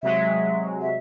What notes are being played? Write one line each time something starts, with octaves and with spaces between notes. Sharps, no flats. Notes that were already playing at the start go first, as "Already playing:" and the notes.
C3 F#3 G#3 E5
E5